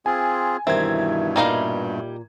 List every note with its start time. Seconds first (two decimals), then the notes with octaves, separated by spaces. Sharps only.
0.06 C4 F4 G#4 G#5
0.67 G2 B2 D#3 E3 G3 C4 E5 G#6
1.36 A#2 G3 D#4 F5